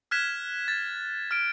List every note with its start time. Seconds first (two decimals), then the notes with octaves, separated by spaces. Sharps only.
0.11 F6 F#6 G#6 B6 E7
0.68 A6
1.31 F6 D7